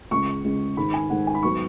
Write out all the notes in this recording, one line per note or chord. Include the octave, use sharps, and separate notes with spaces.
C#2 C#3 G#3 C#6
C#2 C#3 G#3
G#2 D#3 G#3 B5
G#5
G#2 D#3 G#3 F#5
G#5
B5
G#2 F#3 B3 C#6